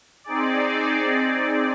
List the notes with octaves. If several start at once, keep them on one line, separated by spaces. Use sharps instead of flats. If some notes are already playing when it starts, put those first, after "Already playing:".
C4 D#4 G#4 D5